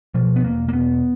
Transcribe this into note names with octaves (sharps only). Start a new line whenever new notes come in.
B2 F3
B3
E1 A#3
A#3
E1 B3